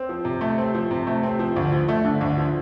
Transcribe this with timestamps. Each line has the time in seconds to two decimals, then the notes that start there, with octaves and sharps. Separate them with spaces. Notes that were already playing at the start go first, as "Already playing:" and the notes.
Already playing: C4
0.09 F3
0.25 C3
0.41 A3
0.58 C4
0.75 F3
0.91 C3
1.07 A3
1.23 C4
1.39 F3
1.56 D2
1.72 F3
1.88 A3
2.05 D3
2.21 D2
2.38 F3